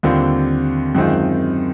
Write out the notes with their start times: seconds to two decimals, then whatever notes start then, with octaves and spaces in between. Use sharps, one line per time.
0.03 D#2 D3 G3 C4 F4
0.95 F#2 D#3 G#3 C4 F4